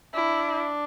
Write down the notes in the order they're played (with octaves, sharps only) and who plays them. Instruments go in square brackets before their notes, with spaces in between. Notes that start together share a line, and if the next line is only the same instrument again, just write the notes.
[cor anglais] D4 [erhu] E4